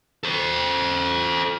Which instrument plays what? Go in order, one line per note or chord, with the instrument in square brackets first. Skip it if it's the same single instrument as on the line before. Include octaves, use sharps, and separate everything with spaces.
[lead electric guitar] A4 C5